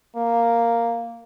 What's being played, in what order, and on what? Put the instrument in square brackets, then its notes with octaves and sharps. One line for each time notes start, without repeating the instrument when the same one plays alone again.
[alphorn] A#3